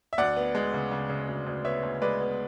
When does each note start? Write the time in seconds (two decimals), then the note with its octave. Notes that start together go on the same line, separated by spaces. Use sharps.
0.13 E5
0.18 D2 D5 F#5
0.36 B3
0.55 G#3
0.73 C#3
0.92 C#3
1.09 C#3
1.28 D2
1.47 D2
1.65 B3 C#5 E5
1.83 D2
2.02 G#3 B4 D5
2.20 B3